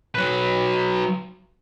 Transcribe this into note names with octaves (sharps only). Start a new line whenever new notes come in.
F#3 B4